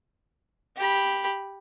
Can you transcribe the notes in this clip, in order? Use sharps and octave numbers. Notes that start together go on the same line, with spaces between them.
G4 B5